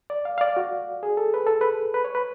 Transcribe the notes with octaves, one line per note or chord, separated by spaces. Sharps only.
D5
F5
F5
D5
F#4
G#4
A4
B4
A4
B4
B4
C#5
B4